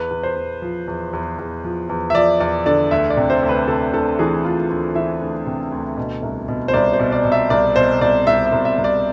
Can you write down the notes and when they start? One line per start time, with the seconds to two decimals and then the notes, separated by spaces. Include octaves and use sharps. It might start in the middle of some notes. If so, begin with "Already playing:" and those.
Already playing: E2 B4
0.11 E2
0.23 C5
0.36 E2
0.62 F3
0.88 E2
1.13 E2
1.38 E2
1.64 F3
1.89 E2
2.10 E5
2.15 F3 D5
2.40 E2 D5
2.66 D3 D5
2.91 D2 E5
3.10 D5
3.17 C3
3.30 C5
3.42 D2
3.49 B4
3.68 C3 A4
3.93 D2 A4
4.19 E3 G#4
4.44 D2 F4
4.70 D2
4.95 E3 E5
5.21 D2
5.46 C3
5.72 D2
5.97 B2
6.22 C2
6.48 B2
6.68 C5
6.73 C2 D5
6.93 C5
6.99 B2
7.12 D5
7.25 B2
7.32 E5
7.50 C2 D5
7.76 B2 C5
8.01 C2 D5
8.27 C2 E5
8.46 E5
8.52 C2
8.65 E5
8.78 C2
8.84 D5